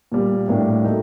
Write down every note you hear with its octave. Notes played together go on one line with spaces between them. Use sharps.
A#2 G3 A#3
A2 G3 A#3 D4 G4
F#3 A3 D#4